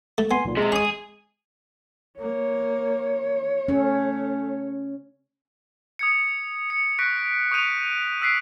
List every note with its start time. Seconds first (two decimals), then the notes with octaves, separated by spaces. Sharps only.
0.18 A3
0.31 B3 G#5 C6
0.45 B1 A#2
0.57 C3 G#3
0.72 G#4 C#6 D#6
2.20 A#3 C#5
3.68 A3 C#4
5.99 D#6 G#6 C#7
6.70 C#7
6.99 C#6 F#6 A#6 B6 D7
7.51 C#6 D#6 G6 D#7 F7
8.22 E6 F#6 B6 C7 D7